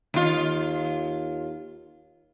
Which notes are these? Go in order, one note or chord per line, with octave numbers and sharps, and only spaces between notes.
D#2 F4